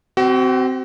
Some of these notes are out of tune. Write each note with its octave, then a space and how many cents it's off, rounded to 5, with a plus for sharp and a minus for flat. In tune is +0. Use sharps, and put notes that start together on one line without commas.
C4 -10 F#4 +35